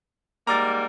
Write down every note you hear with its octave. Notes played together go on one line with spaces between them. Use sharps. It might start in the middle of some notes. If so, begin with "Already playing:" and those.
G#2 G3 A#3 A#5 D6 A6